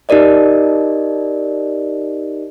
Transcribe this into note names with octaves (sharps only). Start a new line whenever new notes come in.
D#4 G4 A#4 D5 D#5